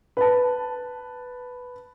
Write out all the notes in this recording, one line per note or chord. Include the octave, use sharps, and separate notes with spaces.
B4 A5